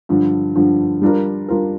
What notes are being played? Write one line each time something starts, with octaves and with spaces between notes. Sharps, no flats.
G2 D3 F3
G2 D3 F3
G3 D4 F4 A#4
G3 D4 F4 A#4